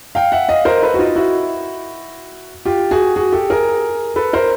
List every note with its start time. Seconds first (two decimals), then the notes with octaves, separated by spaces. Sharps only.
0.15 F5 G5
0.32 E5 F#5
0.48 D#5 F5
0.65 A#4 C5
0.83 A4 B4
0.94 F#4
0.99 D#4 F4
1.16 E4 F#4
2.65 F4 G4
2.91 F#4 G#4
3.16 F#4 G#4
3.32 G4 A4
3.50 G#4 A#4
4.16 A4 B4
4.33 A#4 C5